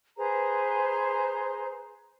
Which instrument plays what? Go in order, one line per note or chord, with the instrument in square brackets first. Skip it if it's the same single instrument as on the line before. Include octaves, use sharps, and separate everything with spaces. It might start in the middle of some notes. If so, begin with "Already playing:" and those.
[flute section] G#4 B4 C5 A#5